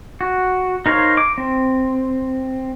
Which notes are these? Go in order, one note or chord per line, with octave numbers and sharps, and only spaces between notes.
F#4
D#4 A#4 C5 C#5 F5
D6
C4